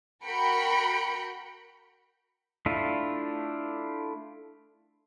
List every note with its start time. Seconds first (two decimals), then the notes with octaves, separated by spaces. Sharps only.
0.24 F#4 A#4 G5 B5 C#7
2.66 A3 D4 E4 F4